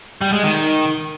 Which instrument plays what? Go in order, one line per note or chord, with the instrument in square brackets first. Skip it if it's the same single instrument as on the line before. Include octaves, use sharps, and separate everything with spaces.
[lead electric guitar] G3
G#3
D#3